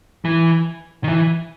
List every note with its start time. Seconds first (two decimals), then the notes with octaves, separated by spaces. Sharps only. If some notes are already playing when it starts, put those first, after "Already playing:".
0.25 E3
1.04 D#3
1.08 E3